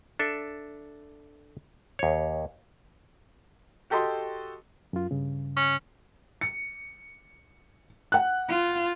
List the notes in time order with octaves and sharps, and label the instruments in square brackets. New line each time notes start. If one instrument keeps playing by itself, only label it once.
[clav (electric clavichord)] D4 A4 E5
D#2 C#5
[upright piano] F#4 G4 A4 D#5 C6
[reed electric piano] F#2 F4
G2 C#3
[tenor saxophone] C#4
[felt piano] C#7
F#5 F#6
[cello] F4